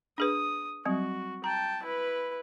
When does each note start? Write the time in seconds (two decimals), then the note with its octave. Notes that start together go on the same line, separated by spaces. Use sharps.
0.18 D4 G#4 B4 D#6
0.85 F#3 G3 C4 F#4
1.44 G5 A5 A#5
1.83 E4 B4